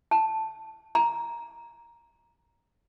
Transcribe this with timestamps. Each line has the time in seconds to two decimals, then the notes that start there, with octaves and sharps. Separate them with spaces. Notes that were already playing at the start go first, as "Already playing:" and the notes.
0.11 A5
0.95 A#5